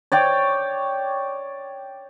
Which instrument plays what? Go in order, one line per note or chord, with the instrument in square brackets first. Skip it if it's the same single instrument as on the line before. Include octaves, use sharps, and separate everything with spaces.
[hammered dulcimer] C#5 D5 G5